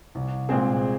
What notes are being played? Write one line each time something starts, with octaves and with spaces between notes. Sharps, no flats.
C2
A#2 G#3 C4 G#4